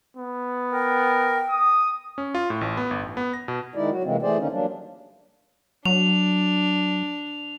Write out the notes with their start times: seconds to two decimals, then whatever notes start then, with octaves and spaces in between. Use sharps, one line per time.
0.17 B3
0.73 A#4 G5
1.48 D#6
2.18 C#4
2.35 F4
2.50 A2
2.61 A1
2.77 B3
2.91 G1
3.03 A1
3.17 B3
3.34 A#6
3.48 B2
3.75 D#3 G#3 D#4 E4 D5
3.90 F#3 F#4
4.04 C3 E3 G#3 A#3 C4
4.22 E3 A3 G#4 C5 D5
4.39 D3 D#3 A#3 C#4 D#4
4.51 F#3 G3 A#3 D4
5.85 F#3 D4 F7